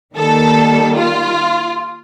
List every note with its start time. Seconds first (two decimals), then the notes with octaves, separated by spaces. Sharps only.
0.15 D#3 G3 A#3 A4
0.95 F4